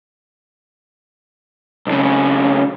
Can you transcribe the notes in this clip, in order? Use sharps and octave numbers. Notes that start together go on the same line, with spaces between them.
B1 C#3